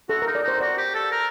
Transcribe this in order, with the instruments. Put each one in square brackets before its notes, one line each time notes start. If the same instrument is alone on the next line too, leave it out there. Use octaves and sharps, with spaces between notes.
[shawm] F#4 [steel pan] A4
[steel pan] A#4
[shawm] D#4
[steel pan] D5
[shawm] D#4 [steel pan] C5
[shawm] F#4 [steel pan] D5
[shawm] G4
A4
A#4